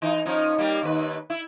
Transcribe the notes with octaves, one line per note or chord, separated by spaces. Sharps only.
E3 D#4
F3 C#4 D#4
G3 A#3 G4
D#2 B4
E4